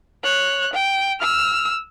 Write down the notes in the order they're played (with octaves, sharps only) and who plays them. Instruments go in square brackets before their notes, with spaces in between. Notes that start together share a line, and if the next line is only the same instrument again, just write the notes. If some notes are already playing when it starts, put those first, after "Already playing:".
[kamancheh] C#5 F#6
G5
E6 F6